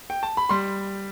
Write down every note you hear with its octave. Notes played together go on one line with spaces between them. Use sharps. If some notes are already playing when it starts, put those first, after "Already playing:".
G5
A5
B5
G3 C6